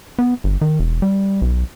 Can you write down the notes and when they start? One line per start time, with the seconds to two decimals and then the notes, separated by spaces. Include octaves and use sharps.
0.19 B3
0.44 G1
0.61 D#3
0.80 E1
1.02 G3
1.42 B1